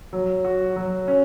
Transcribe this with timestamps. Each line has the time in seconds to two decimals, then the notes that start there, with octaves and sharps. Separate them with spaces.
0.13 F#3
0.45 F#4
0.76 F#3
1.08 C#4